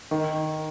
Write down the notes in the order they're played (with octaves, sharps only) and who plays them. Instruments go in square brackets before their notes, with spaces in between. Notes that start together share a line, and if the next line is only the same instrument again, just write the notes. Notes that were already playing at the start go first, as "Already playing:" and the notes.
[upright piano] D#3